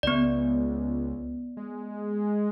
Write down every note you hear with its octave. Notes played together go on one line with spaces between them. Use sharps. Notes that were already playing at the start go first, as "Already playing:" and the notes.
C#2 B3 D5
G#3